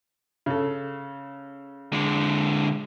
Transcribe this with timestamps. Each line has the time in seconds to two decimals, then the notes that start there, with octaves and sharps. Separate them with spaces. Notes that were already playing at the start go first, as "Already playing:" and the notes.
0.46 C#3 A4
1.93 D3 G#3